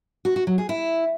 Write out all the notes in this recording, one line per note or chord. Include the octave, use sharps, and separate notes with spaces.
F#4
F#4
F#3
G#4
E4